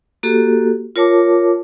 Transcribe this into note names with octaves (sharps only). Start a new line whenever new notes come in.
A#3 F#4 G4 A4
F4 A#4 C#5 A5 D6